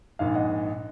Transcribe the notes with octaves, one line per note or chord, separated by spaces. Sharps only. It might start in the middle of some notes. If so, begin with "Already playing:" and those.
A#1 G#2 D#3 F5
D#5 F#5